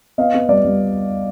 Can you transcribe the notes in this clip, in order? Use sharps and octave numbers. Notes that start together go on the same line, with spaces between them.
B3 D#5 F5
B3
G3 D5
G3